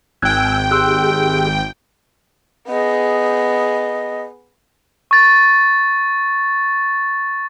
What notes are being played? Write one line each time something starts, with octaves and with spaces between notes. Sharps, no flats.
G#1 G5 G#5 E6 F#6 G#6
G4 G#4 C6 E6 F#6
B3 G#4 D#5
C#6 A6